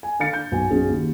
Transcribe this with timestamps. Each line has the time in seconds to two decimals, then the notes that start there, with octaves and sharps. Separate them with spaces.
0.03 G#5
0.19 D3 A4 F5 A6 C#7
0.33 G6
0.52 B1 B3 G#5
0.70 B1 C#4 G#4
0.88 D#2